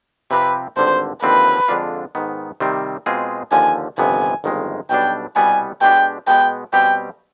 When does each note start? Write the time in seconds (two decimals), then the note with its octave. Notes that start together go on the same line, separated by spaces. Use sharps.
0.31 C3 F3 C4 G4 B4
0.77 G#1 G2 D3 C5
1.23 D#2 D3 F3 C4 B4
1.68 F2 D3 G#3 D4 F4
2.15 G#2 D#3 B3
2.60 C3 D#3 G3 C4
3.06 B2 G#3 C4 F4 G#4
3.52 D#2 D3 F3 G#5
3.98 G1 F2 C3 D#3 B3 G#5
4.44 G1 F2 D#3 G#3
4.89 B1 B2 G3 D4 G5
5.36 C2 B2 G3 B3 G#5
5.81 B2 G#3 D4 G4 G5
6.27 B2 G#3 B3 G5
6.73 B2 G3 C4 G4 G5